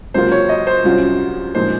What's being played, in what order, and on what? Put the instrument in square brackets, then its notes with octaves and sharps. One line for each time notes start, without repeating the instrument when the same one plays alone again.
[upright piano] C#2 C3 F#3 A#3 F4 [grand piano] C5
[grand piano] C#5
D#5
C5
[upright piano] C2 C3 F#3 C#4 F4
[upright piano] A#2 F3 G#3 D#4 [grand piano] C5